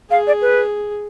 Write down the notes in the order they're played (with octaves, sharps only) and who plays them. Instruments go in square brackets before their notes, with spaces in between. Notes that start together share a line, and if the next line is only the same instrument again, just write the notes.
[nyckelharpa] G#4 [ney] F5
[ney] D5
B4